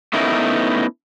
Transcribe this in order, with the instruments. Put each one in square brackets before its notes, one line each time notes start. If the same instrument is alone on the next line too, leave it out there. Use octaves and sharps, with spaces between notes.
[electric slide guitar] A3 B3 C#4 D#4 E4 A#4